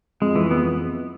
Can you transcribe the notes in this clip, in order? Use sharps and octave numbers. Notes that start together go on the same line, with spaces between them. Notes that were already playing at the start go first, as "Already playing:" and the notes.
F2 G#3
E3
B3